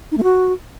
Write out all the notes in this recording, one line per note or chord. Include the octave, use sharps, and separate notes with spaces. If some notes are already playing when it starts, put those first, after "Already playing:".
D#4
A3
F#4